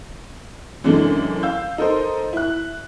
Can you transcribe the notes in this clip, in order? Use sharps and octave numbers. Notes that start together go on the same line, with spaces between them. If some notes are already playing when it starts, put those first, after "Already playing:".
F#2 C3 E3 G#3 A3 D4
F5 E6 G6
D#4 A4 A#4 C5
E4 F#6